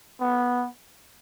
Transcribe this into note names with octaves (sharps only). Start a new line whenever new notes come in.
B3